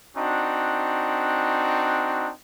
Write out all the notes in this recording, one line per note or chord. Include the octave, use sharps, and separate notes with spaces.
C4 D4 D#4 F#4